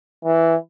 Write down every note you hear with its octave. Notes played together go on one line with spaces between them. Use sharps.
E3